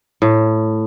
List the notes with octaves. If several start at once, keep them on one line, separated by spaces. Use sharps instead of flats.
A2